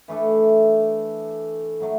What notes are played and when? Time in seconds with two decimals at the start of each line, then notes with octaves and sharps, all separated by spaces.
0.08 E3 A3 D4 A4
1.80 A2 F#3 A3